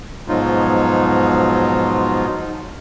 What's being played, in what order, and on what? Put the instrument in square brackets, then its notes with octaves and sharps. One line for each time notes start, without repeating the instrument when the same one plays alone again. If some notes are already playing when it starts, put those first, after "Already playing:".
[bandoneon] G#2 B2 F3 F#3 D#4 F4